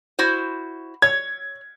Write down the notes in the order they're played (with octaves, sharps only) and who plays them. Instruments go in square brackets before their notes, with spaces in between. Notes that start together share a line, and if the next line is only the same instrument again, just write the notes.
[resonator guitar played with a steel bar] E4 F#4 C5
[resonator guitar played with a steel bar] C#5 [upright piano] G#6